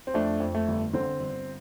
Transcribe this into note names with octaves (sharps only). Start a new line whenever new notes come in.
C4
F2 A3 D4
F2
A3
G1
D3 C4
G1